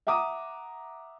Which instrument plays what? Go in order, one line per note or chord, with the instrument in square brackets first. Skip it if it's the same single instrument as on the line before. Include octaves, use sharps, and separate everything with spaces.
[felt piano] E5 F#5 A#5 D6 D#6